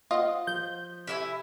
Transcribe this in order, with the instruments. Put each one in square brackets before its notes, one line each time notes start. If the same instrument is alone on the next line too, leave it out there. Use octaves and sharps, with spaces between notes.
[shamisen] F4 [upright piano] C5 F5 F#5 [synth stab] D#5
[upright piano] F3 [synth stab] G6
[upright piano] C3 [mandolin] E4 E5 G#5